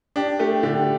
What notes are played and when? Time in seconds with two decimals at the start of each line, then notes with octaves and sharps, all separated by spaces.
0.16 D4 G4
0.39 A3 G4
0.63 D3 G4